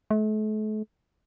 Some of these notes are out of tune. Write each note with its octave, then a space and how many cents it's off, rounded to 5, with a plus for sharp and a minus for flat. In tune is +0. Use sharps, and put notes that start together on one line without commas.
A3 -40